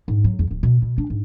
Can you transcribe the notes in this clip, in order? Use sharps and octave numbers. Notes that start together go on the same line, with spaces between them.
G#2
F#3
E2
D1
B2
B2
D4
G#2